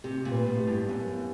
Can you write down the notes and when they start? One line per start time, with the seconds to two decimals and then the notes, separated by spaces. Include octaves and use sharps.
0.04 C3 G4
0.25 A#2
0.32 B4
0.46 A2
0.60 G4
0.67 G2
0.88 F#2 B3
1.17 B3